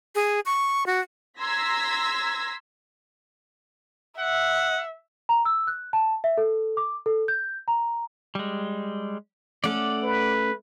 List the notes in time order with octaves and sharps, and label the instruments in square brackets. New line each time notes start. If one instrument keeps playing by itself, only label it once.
[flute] G#4
C#6
F#4
[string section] A#5 C6 E6 G#6 A#6 B6
[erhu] E5 [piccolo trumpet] F#5
[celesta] A#5
E6
F#6
A5
E5
A4
D6
A4
G6
A#5
[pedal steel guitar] G3 G#3
[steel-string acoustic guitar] A3 C#4 A4 [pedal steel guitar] D5 F#5 D6
[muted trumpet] B4